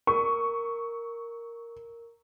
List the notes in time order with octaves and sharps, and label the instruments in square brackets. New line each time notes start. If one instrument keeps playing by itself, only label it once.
[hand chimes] A#4 [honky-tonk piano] C#6